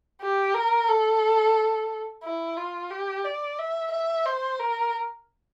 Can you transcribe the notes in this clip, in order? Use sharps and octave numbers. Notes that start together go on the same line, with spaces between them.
G4
A#4
A4
E4
F4
G4
D5
E5
E5
C5
A#4